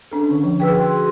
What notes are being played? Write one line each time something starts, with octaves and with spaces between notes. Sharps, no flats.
C#4 D4 A4
D3
F3
G#4 B4 G5 E6
F#4 G#4 G5 C6